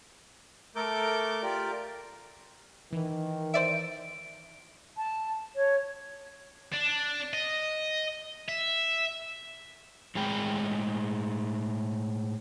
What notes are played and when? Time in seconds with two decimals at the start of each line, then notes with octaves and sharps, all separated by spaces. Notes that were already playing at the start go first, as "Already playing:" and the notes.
0.76 A3 A4 A#4 D6 G6
1.42 F4 G4 A#4 D5
2.93 D#3 E3
3.54 C5 D5 E5 D7
4.96 A5
5.56 C#5
6.72 D4
7.33 D#5
8.48 E5
10.15 A2 G#3 G#4 G5